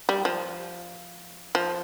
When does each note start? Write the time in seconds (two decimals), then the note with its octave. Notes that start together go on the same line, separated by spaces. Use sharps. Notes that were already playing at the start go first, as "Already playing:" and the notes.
0.09 G3
0.25 F3
1.55 F3